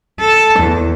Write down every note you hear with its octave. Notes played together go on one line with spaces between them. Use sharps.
A4
E2